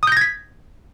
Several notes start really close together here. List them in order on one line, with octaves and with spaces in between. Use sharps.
D#6 G6 A#6 G#6 B6